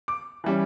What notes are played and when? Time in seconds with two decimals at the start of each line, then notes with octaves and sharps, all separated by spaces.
0.08 D6
0.44 E3 G3 C#4